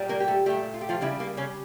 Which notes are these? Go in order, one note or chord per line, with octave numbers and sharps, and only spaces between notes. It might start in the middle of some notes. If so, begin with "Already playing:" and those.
Already playing: A#2 G3
A#3 A#4
G4
A3 A4
A#2 G3 A3 G4
F4
G4
F3 F4
C#3 E3 G3 E4
A#3
C#3 C#4